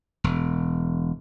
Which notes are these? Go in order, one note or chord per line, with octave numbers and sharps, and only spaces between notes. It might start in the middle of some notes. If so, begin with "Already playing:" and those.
E1